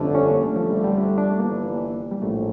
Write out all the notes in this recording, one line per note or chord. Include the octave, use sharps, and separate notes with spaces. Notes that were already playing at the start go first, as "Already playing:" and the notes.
Already playing: G1 F2 D3 A3 C#4 D4
C#4
A#3
A3
G1 F2 D3 F3 A3
G3
G3
D4
D4
A3
G1 G2 E3 A#3
G3
A#1 A2 A3